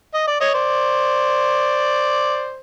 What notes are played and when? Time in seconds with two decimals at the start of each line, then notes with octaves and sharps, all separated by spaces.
0.14 D#5
0.27 D5
0.40 C#5 D#5
0.54 C5 D5